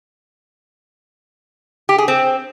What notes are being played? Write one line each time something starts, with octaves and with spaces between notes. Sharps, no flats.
G4
G#4
C4